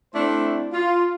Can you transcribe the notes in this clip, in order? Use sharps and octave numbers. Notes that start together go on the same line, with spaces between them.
A3 C4 D4 E4 C5
F4